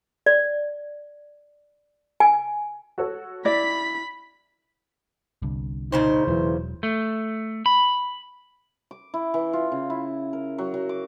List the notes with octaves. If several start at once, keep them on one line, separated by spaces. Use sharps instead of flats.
D5
G#5
F#4 A4 C#5
E4 D5 B5 A#6 B6
G1 C2 G2
A#2 C#3 D#4 C5
E1 E3 F#3
A3
B5
D6
E4
E3
F4
C#3
E4
A#4
F#3
F#3
D6